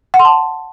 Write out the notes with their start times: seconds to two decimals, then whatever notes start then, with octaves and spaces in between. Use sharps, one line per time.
0.14 F#5
0.19 C6
0.25 A5